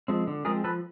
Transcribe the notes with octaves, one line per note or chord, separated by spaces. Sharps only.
F3 G#3 C4
D3
F3 G#3 C4 G#4 A#4
F3 A4 B4